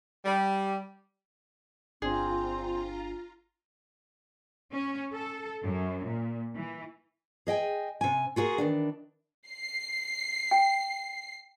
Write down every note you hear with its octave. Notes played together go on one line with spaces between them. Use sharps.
G3
G1 C4 D4 F4 G#4 A#5
C#4
A4
F#2
A#2
E3
G#4 D#5 G5 G#5
C3 G#5
F4 F#4 G#4 A#4
D#3 E3 D4
C7
G5